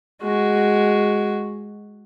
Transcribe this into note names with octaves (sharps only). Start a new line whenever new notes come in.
G#3 F#4